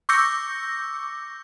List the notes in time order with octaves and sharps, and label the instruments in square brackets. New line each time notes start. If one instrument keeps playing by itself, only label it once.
[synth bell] C#6 D6 E6 G6 A#6 C#7